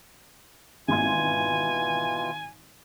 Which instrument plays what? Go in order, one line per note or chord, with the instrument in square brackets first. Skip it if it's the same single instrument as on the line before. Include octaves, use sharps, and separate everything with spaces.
[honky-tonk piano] G#1 C6 G#6 [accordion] B2 E3 F4 [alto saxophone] G#5